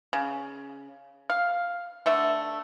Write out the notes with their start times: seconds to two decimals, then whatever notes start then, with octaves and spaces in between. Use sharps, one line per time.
0.13 C#3
1.30 F5
2.06 D3 A3 E5